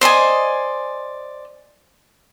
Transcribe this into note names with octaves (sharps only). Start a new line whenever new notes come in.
C5 D5 D#5 G#5